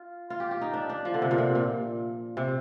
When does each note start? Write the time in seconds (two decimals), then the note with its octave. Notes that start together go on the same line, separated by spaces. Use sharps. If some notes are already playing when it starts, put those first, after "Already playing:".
Already playing: F4
0.30 F4
0.40 G4
0.51 G4
0.61 D#4
0.73 D4
0.89 D4
1.05 F3
1.14 D3
1.22 C3
1.31 A#2
1.38 C3
1.55 A#2
2.37 C3